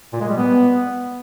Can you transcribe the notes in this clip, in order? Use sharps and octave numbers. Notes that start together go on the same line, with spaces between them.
A#2
G#3
G3
B3